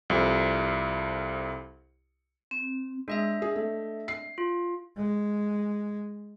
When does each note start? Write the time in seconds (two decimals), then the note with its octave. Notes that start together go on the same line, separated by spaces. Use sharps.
0.10 C2 F2
2.51 C4
3.08 G#3 D4 D#5 E5
3.42 G#4
3.56 A3
4.08 C7
4.38 F4
4.97 G#3